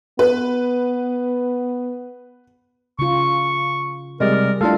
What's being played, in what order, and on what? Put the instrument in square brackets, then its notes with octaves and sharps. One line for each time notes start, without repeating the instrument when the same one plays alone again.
[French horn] B3 [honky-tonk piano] B4
[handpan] C#3 F4 [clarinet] C#6
[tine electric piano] C3 G#3 D5 [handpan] G3 D#5 [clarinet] A#4
[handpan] A3 E4 [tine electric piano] D4 F4 A4 [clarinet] F5